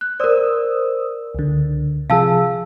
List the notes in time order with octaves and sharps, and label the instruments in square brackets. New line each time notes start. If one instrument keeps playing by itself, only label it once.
[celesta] F#6
[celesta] A#4 D5 [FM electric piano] C5 D#6 E6
[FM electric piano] C#2 D3
[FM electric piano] C3 F3 G#4 [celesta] F5 A5 E6